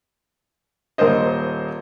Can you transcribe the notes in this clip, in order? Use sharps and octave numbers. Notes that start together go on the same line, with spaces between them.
D#1 A#3 A#4 C5 D#5